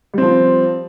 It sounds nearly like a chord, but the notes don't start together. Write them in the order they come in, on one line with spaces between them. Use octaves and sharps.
G3 C4 F3